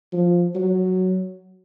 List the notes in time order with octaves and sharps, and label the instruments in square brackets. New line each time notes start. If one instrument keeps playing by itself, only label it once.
[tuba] F3
F#3